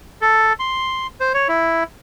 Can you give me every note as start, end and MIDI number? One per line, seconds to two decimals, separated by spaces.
0.21 0.53 69
0.59 1.07 84
1.20 1.33 72
1.34 1.48 73
1.48 1.84 64